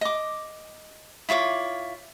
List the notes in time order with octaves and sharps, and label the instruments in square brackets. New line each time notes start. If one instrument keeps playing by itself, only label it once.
[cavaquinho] D#5 D6
E4 F4 C#5 D6